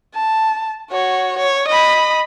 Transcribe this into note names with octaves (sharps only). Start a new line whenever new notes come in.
A5
F#4 C#5
C#5
D#5 B5